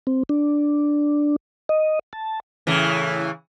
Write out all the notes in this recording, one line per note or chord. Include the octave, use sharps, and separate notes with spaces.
C4
D4
D#5
A5
A2 C#3 E3